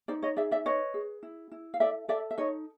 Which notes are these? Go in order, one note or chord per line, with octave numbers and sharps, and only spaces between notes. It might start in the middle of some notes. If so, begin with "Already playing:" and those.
D#4 C5 D5
C#5 D#5
G#4 D5 E5
D5 E5
B4 C#5 D#5
G#4
E4
E4
F5
A4 D5 E5
A4 D5 E5
E5
D#4 C#5 D#5